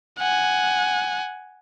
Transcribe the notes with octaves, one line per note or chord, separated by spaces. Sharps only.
F#5 G#5